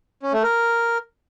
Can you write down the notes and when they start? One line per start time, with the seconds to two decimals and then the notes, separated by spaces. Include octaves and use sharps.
0.23 C#4
0.33 A3
0.43 A#4